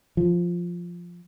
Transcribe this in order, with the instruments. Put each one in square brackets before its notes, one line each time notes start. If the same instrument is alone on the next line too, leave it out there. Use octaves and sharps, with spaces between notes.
[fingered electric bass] F3